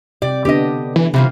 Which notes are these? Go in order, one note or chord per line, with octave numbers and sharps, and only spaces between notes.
C3 G4 D5
D3 B3 D4 G4 D#5
E3
C3 E3 G3 F4